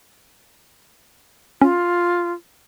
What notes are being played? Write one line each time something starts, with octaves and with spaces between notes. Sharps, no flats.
C#4 F4